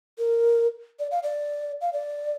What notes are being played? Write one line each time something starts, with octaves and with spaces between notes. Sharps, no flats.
A#4
D5
F5
D5
F5
D5